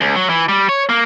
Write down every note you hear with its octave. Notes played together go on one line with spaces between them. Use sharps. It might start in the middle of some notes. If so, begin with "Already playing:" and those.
C#2
F#3
E3
G3
C#5
A#3